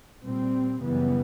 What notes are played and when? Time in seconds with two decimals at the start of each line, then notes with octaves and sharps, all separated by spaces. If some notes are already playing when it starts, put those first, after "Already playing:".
0.23 A#2 G3 C4
0.80 F#2 C#3 E3 G3 B3